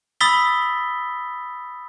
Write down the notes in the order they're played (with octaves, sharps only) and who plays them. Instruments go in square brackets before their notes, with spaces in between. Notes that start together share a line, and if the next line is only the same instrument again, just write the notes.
[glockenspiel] B5 D#6 E6 A6 B6 G7